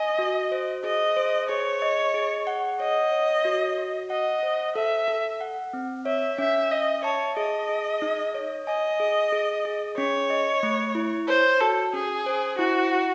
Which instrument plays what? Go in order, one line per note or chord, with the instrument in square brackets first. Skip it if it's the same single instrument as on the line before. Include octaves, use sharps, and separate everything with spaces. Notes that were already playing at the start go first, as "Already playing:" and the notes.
Already playing: [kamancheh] D#5 [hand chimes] G#5
[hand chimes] F#4
C5
[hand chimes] G#4 [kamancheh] D#5
[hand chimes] C5
[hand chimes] G#4 [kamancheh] C#5
[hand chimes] D#5
G#4
F#5
[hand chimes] C#5 [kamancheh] D#5
[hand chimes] C#5
F#4
F#4
[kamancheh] D#5 [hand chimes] F#5
[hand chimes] C5
[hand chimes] A4 [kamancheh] E5
[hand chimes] A4
F#5
C4
[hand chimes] C#5 [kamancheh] E5
[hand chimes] C#4 [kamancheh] E5
[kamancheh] D#5 [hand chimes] E5
[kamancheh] C#5 [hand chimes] A5
[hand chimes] G#4 [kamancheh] D#5
[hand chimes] G#4
D#4
C#5
[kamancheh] D#5 [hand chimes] G#5
[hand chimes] G#4
G#4
G#4
[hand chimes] C#4 [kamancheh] C#5
[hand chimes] D#5
A3
E4
[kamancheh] C5 [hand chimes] C#5
[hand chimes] F#4 [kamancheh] A4
[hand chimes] C#4 [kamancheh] G#4
[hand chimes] C5
[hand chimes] E4 [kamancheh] F#4
[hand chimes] F#5